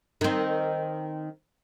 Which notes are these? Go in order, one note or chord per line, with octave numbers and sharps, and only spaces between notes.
D#3 C4